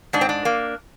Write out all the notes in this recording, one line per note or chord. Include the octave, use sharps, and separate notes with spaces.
G#2 D4
C4
D4
A#3